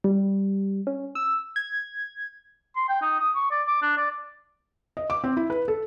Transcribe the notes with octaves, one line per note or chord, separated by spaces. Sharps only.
G3
C#4
E6
G#6
C6
G5
D#4
D#6
C#6
D5
D6
D4
D5
D#5
D6
C4
E4
B4
A4